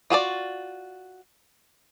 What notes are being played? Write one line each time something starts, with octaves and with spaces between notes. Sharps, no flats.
F4 F#4 G#4 D5